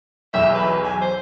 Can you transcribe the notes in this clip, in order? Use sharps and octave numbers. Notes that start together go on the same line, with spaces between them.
B1 E2 E5 E6
B4
G#5
C5